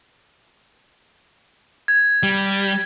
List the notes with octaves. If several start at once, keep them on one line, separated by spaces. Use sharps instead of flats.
G#6
G3